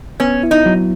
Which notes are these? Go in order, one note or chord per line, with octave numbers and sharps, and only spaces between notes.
B3 C#4
E4
D#4
F#3